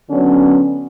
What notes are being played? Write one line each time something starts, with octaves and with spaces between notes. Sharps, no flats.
D3 F#3 B3 C#4